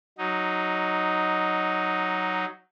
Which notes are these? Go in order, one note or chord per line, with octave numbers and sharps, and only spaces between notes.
F#3 D#4